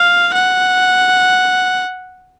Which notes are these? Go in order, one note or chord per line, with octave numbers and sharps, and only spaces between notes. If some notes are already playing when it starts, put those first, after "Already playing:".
Already playing: F5
F#5